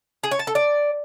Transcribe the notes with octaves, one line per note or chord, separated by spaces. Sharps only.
G#4
C#5
A5
A4
D5